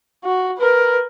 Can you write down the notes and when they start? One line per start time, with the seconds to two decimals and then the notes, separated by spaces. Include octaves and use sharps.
0.24 F#4
0.58 A#4 B4